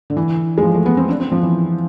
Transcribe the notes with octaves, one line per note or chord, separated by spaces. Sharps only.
D3
E3
G#3
F3
A3
B3
C4
D4
C4
F3
E3